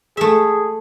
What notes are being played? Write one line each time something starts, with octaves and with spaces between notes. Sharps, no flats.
A3 G#4 E5